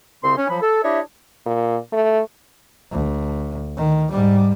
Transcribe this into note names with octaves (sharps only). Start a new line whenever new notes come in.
C2 C#3 C4 C6
C#4
F3 F#3 B5
A4
D4 E4 G4 C#5 D#5 E5
A#2
A3
D2
D#3
G#2 G3